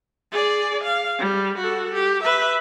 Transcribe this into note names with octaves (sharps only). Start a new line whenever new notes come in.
G#4 D5
F5
G3
F#4 A4
G4
B4 E5